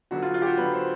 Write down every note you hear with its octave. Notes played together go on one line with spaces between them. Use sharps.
D3 F#3 B3 F#4
F4
F4
G4
F#4
D3 F#3 B3 B4
C5